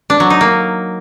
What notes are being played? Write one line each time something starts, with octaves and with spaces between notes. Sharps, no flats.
D4
F#3
D#4
A#3